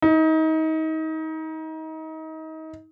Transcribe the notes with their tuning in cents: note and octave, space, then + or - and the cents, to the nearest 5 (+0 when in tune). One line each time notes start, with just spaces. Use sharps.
D#4 +30